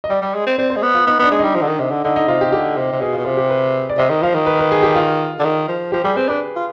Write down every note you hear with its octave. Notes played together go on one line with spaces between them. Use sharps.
D#5
G3 D5
G3
G#3
C4
C4 D5
C5
G#3
B3
F4
B3 D#4
B3 D4
G#3
G3 D#4
F3
D3
D#3
C3
D3
D3 D#4
D#4
C3 F4
G4
D3 G4
C3
C3
B2 G#4
F4
B2
C3 F4
G4
B4
D5
C3 D#5
D#3
F3 F5
D#3
B4
B4
G#4
G4
F4
D3
D#3
F3
F3 G4
G3 G#4
C4 B4
D4 B4
F4